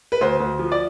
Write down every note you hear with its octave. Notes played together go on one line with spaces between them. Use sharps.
B4
D2 C5
D2
F3
D5